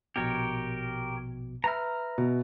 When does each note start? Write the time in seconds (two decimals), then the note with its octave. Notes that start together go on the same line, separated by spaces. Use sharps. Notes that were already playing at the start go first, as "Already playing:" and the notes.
0.16 A#1 B2 G4 A#4 C#5
1.64 B4 E5 A#5 F6
2.18 B2